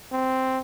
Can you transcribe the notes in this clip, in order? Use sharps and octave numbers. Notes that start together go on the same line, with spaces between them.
C4